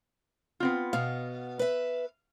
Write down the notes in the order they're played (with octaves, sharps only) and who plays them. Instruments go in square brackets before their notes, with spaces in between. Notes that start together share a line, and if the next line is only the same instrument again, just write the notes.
[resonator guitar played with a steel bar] B3 C4 F4
[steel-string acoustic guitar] B2 B3 [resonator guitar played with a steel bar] F5
[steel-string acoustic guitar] B4 E5